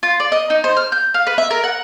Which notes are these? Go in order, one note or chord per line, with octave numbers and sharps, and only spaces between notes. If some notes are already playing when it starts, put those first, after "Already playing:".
F4
D5
D#5
D#4
C5
F6
G6
F5
B4
E5
A#4
F#5